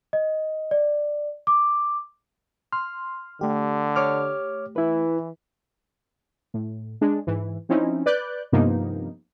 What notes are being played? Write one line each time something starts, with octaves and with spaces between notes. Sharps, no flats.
D#5
D5
D6
C6 F6
D3 A3 G4
C#5 D6 F6
E3 E4 B4
A2
G#3 D4 G#4
G#2 E3
F3 C4 C#4 D#4 E4
B4 D5 F#6 G6
G2 C3 F3 A#3 B3 D#4